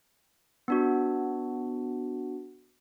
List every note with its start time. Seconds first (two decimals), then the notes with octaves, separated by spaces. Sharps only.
0.68 B3 D4 F#4